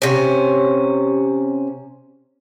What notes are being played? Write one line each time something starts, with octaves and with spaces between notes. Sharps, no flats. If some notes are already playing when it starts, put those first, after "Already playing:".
C3 C#4